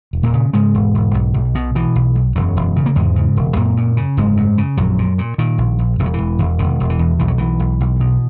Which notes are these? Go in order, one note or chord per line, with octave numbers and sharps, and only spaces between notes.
E1
A#2 A#3
C#3
G#2 C#3 G#3
E1
E1
B1
B1
B2
B2 E3
B1
B1
E1 F#2 F#3
E1
C#3
A#3
E2 G#2 G#3
C#3
E1
F#2 A#2 A#3
F#2
C#3
F#1 G#2 G#3
F#2
C#3
A#1 F#2 F#3
A#2
A#2
A#2 D#3
A#1
A#1
E1 E3
F#3
E1 E3
E1
E1 D#3
E1
E3
E2
B1 E3
F#3
B1 E3
B1
B1
B2